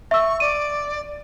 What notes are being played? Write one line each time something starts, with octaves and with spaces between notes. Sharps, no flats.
E5 C#6 E6
D5 D#7